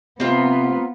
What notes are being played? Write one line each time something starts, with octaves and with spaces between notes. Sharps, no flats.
C3 B3 C4 F4 A#5